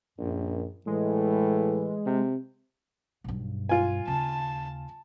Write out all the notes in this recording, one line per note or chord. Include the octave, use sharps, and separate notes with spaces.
A#1 F#2
A2 E3 G#3
C3
B1 G2
F4 G#5
D#2 C#3 A5